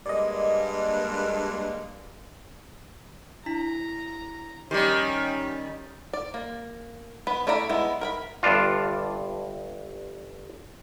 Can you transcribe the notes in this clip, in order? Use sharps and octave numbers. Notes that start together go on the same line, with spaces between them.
G2 G#3 A#3 D5 D#5
D4 E4 A#5 B6
D#3 G3 C#4 G4 D6
D5
A#3
B3 B4
A3 E4 D5 A#5 B5
G#3 B3 E4
A#4 F#5 B5
G1 G2 D4 F4